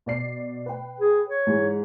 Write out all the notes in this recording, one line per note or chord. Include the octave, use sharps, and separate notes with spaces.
B2 D5 C7
B4 G5
G#4
C#5
G#2 E3